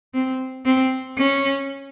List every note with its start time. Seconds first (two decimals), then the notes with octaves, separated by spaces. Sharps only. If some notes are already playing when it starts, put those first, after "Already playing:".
0.14 C4
0.65 C4
1.18 C#4